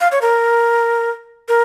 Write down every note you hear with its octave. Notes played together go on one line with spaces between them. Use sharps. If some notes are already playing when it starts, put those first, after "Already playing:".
F5
C#5
A#4
A#4